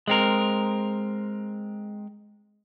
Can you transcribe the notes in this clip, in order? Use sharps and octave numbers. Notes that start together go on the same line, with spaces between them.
G#3 C4 A#4